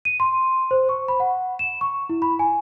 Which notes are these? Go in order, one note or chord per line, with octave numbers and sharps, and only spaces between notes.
D#7
C6
C5
C#6
B5
F#5
E7
C#6
E4
B5
G#5